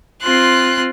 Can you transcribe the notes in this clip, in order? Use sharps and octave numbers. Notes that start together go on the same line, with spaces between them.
C4 F4 C6 F#6